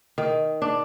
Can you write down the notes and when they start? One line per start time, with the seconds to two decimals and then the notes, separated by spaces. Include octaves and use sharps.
0.18 D#3
0.62 D4